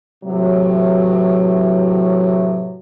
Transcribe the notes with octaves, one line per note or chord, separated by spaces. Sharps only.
A2 C3 E3 F#3